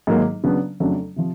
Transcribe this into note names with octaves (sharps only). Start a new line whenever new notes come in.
G#2 D#3 F#3 A#3
C#3 F#3 B3 D4
F2 C#3 F#3 A3 D4
C3 F3